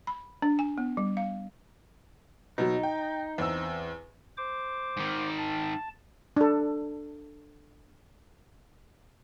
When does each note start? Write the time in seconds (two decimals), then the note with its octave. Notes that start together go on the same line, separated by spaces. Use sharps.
0.07 B5
0.42 D4
0.59 G#5
0.78 B3
0.97 G3
1.17 F5
2.58 B2 F#3 D#4
2.83 G5
3.38 E2 C4 E6
4.37 C5 D6
4.97 G#2 D#3
5.38 A5
6.37 D4 A4